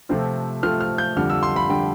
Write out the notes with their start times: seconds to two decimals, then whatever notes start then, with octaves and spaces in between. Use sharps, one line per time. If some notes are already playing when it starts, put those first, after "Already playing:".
0.09 C3 F3 A3 C4 F4
0.63 C3 F3 A3 C4 F4 F6
0.81 F6
0.98 G6
1.16 F2 D3 G3 F6
1.30 E6
1.43 C6
1.56 B5
1.70 D3 G3 G5